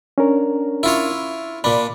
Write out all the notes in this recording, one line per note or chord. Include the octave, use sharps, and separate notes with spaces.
C#4 D4 A#4
E4 F4 C#5
A#2 D4 B5